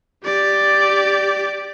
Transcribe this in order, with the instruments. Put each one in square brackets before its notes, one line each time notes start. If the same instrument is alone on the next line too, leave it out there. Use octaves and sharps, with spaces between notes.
[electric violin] G4 D5